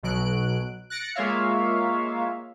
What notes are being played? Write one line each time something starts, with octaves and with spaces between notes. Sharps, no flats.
B1 B2 F#3 F#6 D7
F#6 A6 A#6 C#7 D7
G#3 A#3 F4 C#5 E5 F5